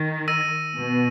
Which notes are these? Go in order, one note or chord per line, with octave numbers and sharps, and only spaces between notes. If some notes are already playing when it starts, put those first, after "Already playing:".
Already playing: D#3
E6 A#6 D#7
B2